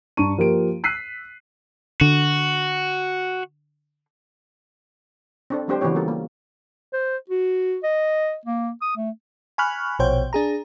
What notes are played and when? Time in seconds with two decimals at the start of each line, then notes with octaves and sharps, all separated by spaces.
0.17 G2 A5 A#5 C#6 D#7
0.38 F3 A#3 F4 G4 A#4 D7
0.84 E6 F#6 B6 C7 D#7
2.01 D3 F#4
5.50 C4 D4 A4
5.68 F#3 G#3 C4 D4 G4 C5
5.81 C#3 E3 B3 F#4 G4 C#5
5.95 G3 A#3 F4 A4 A#4
6.08 A#3
6.94 C5
7.30 F#4
7.83 D#5
8.46 A#3
8.82 D#6
8.96 A3
9.58 G#5 B5 C#6 F6 F#6
9.99 A#1 B2 C5 C#5 G5
10.33 D4 G#4 A#5